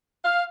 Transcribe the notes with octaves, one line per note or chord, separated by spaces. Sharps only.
F5